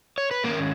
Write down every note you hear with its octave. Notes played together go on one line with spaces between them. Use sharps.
C#5
B4
G#2 D#3 A#3 C#4 A#4